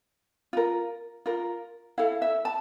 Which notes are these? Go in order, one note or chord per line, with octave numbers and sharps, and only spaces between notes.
F4 A#4
F4 A#4
E4 A4 F5
E5
A5